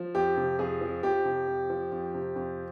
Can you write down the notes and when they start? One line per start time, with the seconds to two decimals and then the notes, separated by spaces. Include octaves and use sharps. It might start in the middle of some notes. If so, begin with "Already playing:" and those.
Already playing: F3
0.15 F2 G4
0.37 C3
0.59 F2 G#4
0.81 F3
1.03 F2 G4
1.25 C3
1.47 F2
1.70 F3
1.92 F2
2.14 C3
2.36 F2